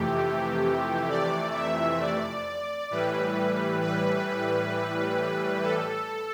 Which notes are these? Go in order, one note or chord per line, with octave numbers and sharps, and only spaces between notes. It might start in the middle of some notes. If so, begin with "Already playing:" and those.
Already playing: F2 C3 E3 A3 G4
D5
E5
D5
A2 E3 G3 B4
B4
A4